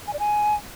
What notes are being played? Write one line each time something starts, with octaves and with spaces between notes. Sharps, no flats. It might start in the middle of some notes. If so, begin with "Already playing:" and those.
G#5
D5
G#5